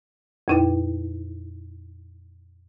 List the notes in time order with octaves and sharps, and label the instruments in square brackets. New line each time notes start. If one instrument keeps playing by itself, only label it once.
[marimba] F2 A#2 D#4 E4 B4 G5